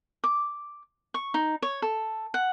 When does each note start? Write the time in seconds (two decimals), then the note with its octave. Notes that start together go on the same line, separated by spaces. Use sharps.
0.24 D6
1.14 C#6
1.34 D#4
1.62 C#5
1.82 A4
2.34 F#5